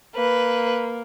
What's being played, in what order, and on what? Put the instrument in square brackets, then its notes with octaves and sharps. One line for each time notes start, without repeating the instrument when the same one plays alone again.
[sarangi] A#3 [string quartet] B4